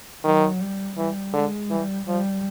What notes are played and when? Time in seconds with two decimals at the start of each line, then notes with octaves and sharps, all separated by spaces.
0.23 D#3 F#3
0.60 G3
0.97 E3 G3
1.33 D3 G#3
1.70 E3 G3
2.07 F3 G3